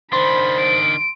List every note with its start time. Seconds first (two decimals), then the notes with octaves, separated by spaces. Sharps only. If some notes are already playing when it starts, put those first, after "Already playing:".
0.13 D#3 D4 C5 B5 C6
0.60 D7